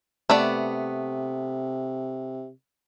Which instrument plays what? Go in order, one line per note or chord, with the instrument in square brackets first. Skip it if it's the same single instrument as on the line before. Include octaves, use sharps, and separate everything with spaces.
[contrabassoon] C3 [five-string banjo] A3 B3 D5